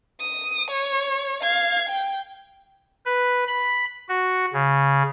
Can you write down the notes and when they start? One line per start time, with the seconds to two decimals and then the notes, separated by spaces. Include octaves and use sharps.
0.20 D#6
0.71 C#5
1.43 F5 G#6
1.89 G5
3.06 B4
3.47 B5
4.09 F#4
4.53 C#3